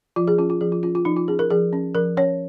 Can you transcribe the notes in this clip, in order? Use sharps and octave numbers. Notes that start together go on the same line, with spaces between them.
F3 F4
G#4
C#4 F4
F4
F3 G#4
F4
C#4 F4
F4
F3 D#4
F4
C#4 G#4
A#4
F3 G#4
C#4
F3 A#4
C#4 C#5